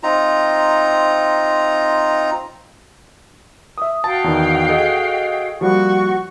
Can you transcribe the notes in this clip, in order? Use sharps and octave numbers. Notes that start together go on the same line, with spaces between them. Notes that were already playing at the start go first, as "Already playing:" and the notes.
C4 D#4 F4 A#5
E5 D#6
F#4 F5 G5 A5
E2 D#3
G#4 A4 D#5
F3 G3 A#3 F#4 C#6